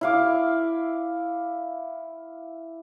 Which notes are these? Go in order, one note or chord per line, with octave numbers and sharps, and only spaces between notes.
E4 F5 D6